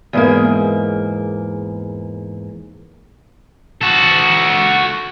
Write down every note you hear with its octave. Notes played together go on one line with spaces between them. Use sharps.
E2 G#2 A#3
F#4 A4